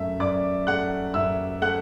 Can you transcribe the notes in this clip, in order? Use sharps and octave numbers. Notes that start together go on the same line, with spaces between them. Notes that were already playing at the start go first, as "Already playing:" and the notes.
Already playing: F#2 A3 E5
F#2 D5 D6
A3 F#5 F#6
F#2 E5 E6
A3 F#5 F#6